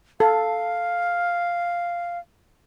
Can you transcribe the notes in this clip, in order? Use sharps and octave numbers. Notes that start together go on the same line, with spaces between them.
A4 F5